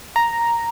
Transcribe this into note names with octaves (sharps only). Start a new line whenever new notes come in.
A#5